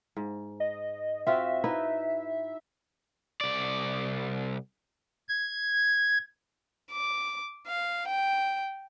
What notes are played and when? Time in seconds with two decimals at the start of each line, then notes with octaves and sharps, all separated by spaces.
0.17 G#2
0.60 D#5
1.27 C4 F4 F#4 E5
1.64 D#4 E4 B4
3.41 C2 D5
5.29 G#6
6.92 D6
7.66 F5
8.08 G5